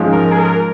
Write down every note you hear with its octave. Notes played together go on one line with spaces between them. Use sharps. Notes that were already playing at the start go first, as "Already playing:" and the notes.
Already playing: G#2 F3 G#3 C#4 F4
A#4
G#4
A#4